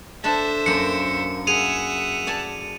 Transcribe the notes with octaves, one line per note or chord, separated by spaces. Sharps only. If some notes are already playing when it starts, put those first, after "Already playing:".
D4 A4 C5 E5 A5
F#2 A#3 C#7
G#4 E5 F#5 D#7 F7
D5 G#5 A5